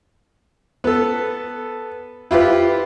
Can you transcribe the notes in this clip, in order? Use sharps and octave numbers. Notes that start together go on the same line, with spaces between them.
B3 A4
E4 F4 G4 B4